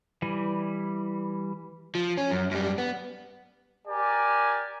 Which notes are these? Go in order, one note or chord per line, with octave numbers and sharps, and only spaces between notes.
E3 G3
F3
C#4
F#2
F#2 G3
B3
G4 A#4 D5 G#5